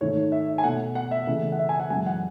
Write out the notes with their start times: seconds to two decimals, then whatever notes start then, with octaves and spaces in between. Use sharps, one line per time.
0.01 G#2 D#3 A3 C#5
0.32 E5
0.58 G#5
0.64 B2 A3 F#5
0.95 F#5
1.11 E5
1.27 C#3 E3 A3 E5
1.52 F#5
1.59 E5
1.69 G#5
1.80 F#5
1.90 F#2 E3 G#3 G#5
2.06 F#5